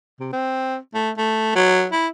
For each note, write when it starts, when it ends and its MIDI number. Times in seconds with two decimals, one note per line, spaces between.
0.20 0.28 48
0.33 0.77 60
0.94 1.11 57
1.18 1.51 57
1.55 1.87 54
1.92 2.08 64